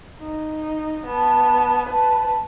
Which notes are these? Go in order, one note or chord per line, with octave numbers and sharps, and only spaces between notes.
D#4
B3 A5
B4 A5